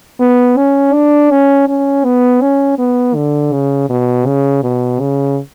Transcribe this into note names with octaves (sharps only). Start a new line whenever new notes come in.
B3
C#4
D4
C#4
C#4
B3
C#4
B3
D3
C#3
B2
C#3
B2
C#3